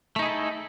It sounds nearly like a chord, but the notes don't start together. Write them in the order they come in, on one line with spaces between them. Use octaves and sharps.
A3 D#4 G#4 E4 A4